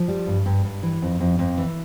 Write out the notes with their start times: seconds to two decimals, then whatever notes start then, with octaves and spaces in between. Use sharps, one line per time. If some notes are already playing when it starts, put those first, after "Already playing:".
Already playing: F3
0.08 G3
0.27 G2
0.46 G2
0.65 G2
0.83 E3
1.02 F2
1.20 F2
1.39 F2
1.58 E3